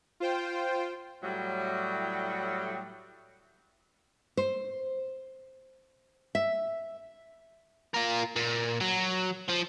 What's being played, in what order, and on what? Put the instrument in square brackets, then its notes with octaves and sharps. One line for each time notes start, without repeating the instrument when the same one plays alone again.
[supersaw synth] F4 C5 G5
[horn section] A2 F#3 G3
[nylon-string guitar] C5
E5
[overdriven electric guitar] F4 A#4
A#2
F#3
F3